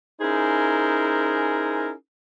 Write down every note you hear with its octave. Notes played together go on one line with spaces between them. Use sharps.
C#4 D#4 E4 G#4 A#4 C5